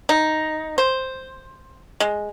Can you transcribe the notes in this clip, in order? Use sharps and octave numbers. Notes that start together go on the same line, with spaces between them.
D#4
C5
G#3